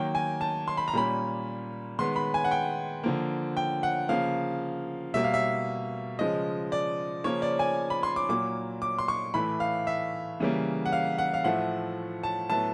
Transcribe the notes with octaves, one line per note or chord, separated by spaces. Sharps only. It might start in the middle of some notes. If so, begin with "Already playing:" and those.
Already playing: D#3 F#3 A#3 G5
G#5
A5
C6
B5
A#5
A#2 G3 A#3 C#4 B5
D#3 G#3 B3 C6
B5
G#5
F#5
G5
D3 F3 A#3
G5
F#5
C#3 F3 A#3 F5
B2 G3 A#3 E5
F5
E5
C#3 F3 G#3 D#5
D5
C#3 F3 A#3 C#4 C#5
D5
G#5
B5
C6
D6
A#2 F#3 A#3 D6
D6
C6
C#6
A2 E3 A3 B5
F5
E5
C#3 E3 G3 A#3
F#5
F5
F#5
F5
A2 F3 A3 F#5
A5
A2 F#3 B3 A5